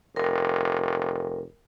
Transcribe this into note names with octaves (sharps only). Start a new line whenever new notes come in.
F1 A#4